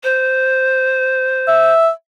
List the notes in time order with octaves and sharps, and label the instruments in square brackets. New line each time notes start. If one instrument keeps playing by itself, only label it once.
[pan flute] C5
[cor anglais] E5